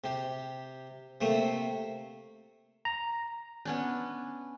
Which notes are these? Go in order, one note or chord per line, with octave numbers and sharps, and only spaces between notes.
C3 G4
C3 A3 A#3 C4
A#5
B3 C#4 D4